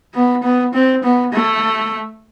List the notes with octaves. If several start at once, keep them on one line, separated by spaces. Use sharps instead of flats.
B3
B3
C4
B3
A3